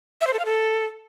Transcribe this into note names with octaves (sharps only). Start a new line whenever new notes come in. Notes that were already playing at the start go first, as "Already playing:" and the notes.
E5
C5
A4
F5
A4